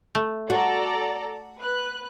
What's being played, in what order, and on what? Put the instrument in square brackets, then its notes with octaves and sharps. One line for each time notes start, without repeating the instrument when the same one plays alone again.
[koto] A3
[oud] F#4 [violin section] A4 D5 A#5
[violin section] B4 F#6